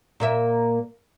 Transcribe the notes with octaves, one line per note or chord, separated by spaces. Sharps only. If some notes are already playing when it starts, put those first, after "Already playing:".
A#2 A#3 E5